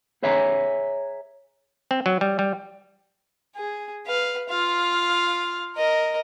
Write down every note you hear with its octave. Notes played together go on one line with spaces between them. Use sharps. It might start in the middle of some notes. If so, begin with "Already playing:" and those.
G#4 B4 C#5 E5 G#5 A#5
C4
F#3
G3
G3
G#4
B4 F5
F4 F5
A#4 D#5